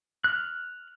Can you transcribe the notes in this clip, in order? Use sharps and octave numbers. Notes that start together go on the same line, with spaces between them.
F6 F#6